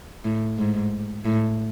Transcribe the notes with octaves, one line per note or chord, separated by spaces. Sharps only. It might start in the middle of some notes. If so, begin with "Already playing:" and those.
A2
G#2
A2